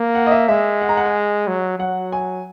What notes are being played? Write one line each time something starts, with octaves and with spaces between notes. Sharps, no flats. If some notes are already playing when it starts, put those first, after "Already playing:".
Already playing: A#3
F#5
D#5
E5
G#3 E5
F#5
A#5
F#5
G#5
F#3
F#3 F#5
G#5